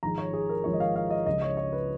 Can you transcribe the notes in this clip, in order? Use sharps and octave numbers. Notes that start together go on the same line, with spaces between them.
G#1 G#2 F3 G#3 A#5
C#5
G#4
A#4
G#1 G#2 F3 G#3 C#5
D#5
F5
F5
D#5
C#2 C#3 F3 D#5
C#5
C#5
B4